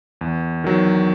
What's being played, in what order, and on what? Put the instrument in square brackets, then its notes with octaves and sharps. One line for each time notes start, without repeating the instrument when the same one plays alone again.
[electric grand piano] E2
D#3 F#3